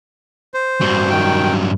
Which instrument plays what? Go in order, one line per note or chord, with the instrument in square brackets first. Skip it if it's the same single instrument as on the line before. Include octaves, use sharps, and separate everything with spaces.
[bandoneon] C5
[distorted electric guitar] G2 F#3
[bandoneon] D#3 G5